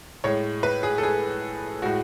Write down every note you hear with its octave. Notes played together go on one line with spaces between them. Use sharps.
A2 G#3 C#5
B4
G#4
A4
G#4
A2 G#3 F#4